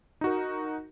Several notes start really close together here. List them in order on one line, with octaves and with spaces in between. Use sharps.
D#4 F#4 A#4